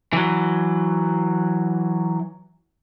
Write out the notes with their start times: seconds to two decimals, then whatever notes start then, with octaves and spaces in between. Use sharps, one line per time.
0.13 E3 F#3